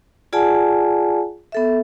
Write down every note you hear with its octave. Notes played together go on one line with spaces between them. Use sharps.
F4 G#4 D5 F#5 G#5 A5
B3 A4 E5